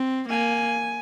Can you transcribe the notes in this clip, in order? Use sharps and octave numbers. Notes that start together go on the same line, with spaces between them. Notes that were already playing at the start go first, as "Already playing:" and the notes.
Already playing: C4
A#3 G#5